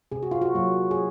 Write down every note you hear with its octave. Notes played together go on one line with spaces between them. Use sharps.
C3 G#4
F#4
F4
F#4
F#3 A#3
G#4